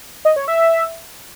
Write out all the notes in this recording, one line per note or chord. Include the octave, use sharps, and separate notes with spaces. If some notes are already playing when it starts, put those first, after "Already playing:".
D#5
C#5
E5